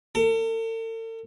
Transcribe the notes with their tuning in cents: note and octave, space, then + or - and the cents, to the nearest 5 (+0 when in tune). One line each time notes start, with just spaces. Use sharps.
A4 +45